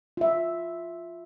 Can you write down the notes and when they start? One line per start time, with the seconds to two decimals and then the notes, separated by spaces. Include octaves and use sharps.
0.17 F4 E5